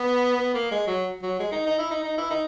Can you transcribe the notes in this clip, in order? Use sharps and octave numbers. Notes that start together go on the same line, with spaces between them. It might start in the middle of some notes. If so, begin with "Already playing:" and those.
Already playing: B3
B3
A#3
G#3
F#3
F#3
G#3
D#4
D#4
E4
D#4
D#4
E4
D#4